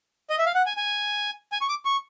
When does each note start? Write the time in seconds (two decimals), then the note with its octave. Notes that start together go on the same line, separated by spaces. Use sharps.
0.30 D#5
0.39 E5
0.46 F5
0.55 F#5
0.66 G#5
0.77 G#5
1.52 G#5
1.61 C#6
1.69 D6
1.85 C#6